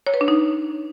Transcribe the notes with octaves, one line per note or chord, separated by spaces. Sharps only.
C#5
B4
D4
D#4